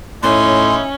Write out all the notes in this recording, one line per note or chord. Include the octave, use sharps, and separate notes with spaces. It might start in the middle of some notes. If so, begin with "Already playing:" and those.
A2 C#4 D#4 E4 C6